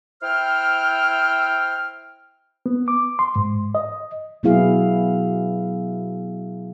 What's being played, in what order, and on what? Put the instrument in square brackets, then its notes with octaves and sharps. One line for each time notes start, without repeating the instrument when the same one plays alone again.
[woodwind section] E4 C5 G5 E6 F6
[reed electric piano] B3
D6
C6
G#2
D#5
[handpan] B2 F#3 B3 E4 G#4 F5